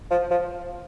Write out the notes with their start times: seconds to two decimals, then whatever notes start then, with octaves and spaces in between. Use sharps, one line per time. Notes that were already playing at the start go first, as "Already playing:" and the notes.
0.11 F3
0.31 F3